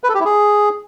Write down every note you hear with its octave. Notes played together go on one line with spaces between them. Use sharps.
B4
A4
G4
E4
G#4